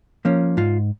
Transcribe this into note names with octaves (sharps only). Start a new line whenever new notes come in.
F3 A#3 C#4
G#2 F4